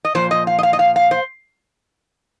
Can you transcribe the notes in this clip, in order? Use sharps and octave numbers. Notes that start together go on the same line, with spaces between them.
D#5
A#2 F3 C5
D#5
F5
D#5
F5
D#5
F5
F5
C5